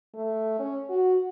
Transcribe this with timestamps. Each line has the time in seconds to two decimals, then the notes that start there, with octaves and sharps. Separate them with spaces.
0.15 A3
0.59 C#4
0.89 F#4